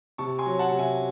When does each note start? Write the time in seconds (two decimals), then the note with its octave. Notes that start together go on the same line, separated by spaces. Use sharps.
0.18 C3 A5 C#6
0.39 G#5 C6
0.46 F#3
0.59 F#5 A5
0.72 C3
0.79 E5 G#5